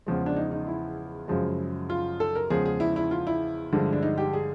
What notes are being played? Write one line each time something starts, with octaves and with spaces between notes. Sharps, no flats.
E2 C#3 F3 G#3
D4
D#4
D#4
E4
F#2 C#3 F3 G#3
F4
A4
A#4
E2 C#3 F3 G#3 G#4
G#4
E4
E4
F4
E4
G2 D3 F3 G#3
D4
D#4
G4
G#4